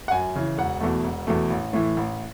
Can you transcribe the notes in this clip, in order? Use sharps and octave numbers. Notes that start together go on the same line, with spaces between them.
F#5
F#2 G#5
C#3 E3
E1 F#5
E2 B2 A3
E1
E2 B2 A3
A1
A2 E3
A1